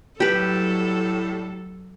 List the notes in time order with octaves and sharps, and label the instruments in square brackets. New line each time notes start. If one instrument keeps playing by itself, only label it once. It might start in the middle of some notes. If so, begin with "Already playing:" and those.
[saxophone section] A2 G3 [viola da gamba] F#3 A4 [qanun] G4 B4